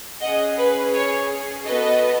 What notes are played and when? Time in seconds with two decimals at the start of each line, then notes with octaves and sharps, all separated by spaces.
0.21 C#4 G#4 D#5 F#5
0.57 B4
0.93 C#5
1.66 B3 F#4 A4 B4 D#5